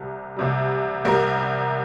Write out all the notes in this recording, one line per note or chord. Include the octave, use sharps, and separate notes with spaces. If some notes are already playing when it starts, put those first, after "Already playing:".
Already playing: C2 C3 G3
C2 C3 G3
C2 C3 G3 A#4